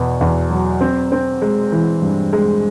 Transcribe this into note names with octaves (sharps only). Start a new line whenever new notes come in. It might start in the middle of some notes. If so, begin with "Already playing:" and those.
Already playing: E2 B2 B3
E2
F#3
C4
C4
G#3
E3
G2
G#3